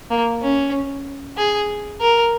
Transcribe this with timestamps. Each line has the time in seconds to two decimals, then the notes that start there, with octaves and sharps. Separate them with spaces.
0.10 A#3
0.42 C#4
1.38 G#4
2.01 A#4